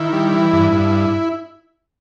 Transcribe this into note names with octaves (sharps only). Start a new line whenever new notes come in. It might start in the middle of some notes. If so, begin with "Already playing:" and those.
Already playing: D#3 E4
G3
E3
G2
G2